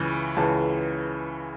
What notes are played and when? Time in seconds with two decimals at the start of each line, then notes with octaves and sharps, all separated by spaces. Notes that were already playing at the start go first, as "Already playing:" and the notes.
Already playing: C#2 C#3 E3
0.36 C#2 C#3 E3 A5